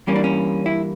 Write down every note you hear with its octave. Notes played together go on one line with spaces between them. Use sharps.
G2 E3 G3 A#3 C#4
D4
C#4
E4